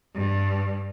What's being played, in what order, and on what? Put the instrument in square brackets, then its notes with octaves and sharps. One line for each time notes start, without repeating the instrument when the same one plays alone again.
[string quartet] G2